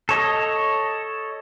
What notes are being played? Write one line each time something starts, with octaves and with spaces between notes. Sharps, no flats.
A4 C#5 D#5